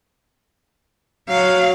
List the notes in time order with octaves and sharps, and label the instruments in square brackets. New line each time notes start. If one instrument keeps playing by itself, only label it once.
[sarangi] F#3 [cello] F5